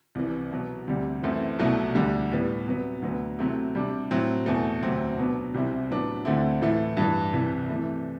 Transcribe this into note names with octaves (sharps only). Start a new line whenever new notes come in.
C2 C3 E3
B2 F#3 B3
D2 C3 G3
F#2 E3 A3 C4 E4
C2 B2 F#3 A3 E4
D2 D3 G3
A2 G3 B3
C3 F#3 B3
D2 D3 F#3 B3
C3 F#3 A3 C4 E4
C3 G3 D4
A2 F#3 C4 E4
E2 B2 A3
D2 C3 F#3 C4
B2 F#3 B3 D4
C2 C3 G3 C4 E4
A2 F#3 B3 D4
D2 D3 A3 C4 E4
A2 E3 A3 E4
G2 E3 G3
C2 C3 E3
C3 E3 A3